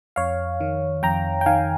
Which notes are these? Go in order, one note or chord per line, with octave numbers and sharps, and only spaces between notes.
F2 C#5 F5
D#3
F2 G5 A#5
G5
D#3 F5 G#5